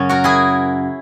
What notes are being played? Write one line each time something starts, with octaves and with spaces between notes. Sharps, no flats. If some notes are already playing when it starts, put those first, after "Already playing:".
Already playing: F#2 C#3 F#3 C#4
F#4 A#4
E4 G#4